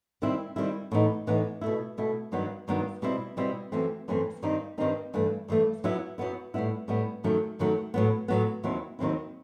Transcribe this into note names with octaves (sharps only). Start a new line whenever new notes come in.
D#3 G3 C4 E4
D#3 G3 C4 E4
A2 E3 B3 D#4
A2 E3 B3 D#4
B2 A3 E4
B2 A3 E4
G2 D#3 F#3 B3
G2 D#3 F#3 B3
B2 G3 C4 E4
B2 G3 C4 E4
F#2 E3 A3 C4
F#2 E3 A3 C4
G2 D#3 G3 C4 D#4
G2 D#3 G3 C4 D#4
G2 E3 A3
G2 E3 A3
F#2 F#3 B3 E4
F#2 F#3 B3 E4
A2 G3 B3 E4
A2 G3 B3 E4
F#2 D#3 F#3 A3
F#2 D#3 F#3 A3
A2 F#3 B3
A2 F#3 B3
D#2 D#3 F#3 C4 E4
D#2 D#3 F#3 C4 E4